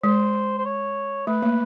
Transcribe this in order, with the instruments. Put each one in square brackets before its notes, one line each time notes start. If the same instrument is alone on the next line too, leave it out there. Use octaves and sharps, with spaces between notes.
[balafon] G#3 [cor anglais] C5
[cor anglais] C5
C#5
[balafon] A3 [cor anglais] B4
[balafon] A#3